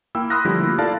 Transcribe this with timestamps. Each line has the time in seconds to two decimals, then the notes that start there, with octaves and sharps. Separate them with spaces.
0.15 A#3 E4 G5 E6
0.30 B5 C6 D#6 F6 F#6 A#6
0.45 D3 F3 G3 A3 E4 G4
0.61 A#3 E4 F4
0.79 E4 F4 A4 D5 F5 A5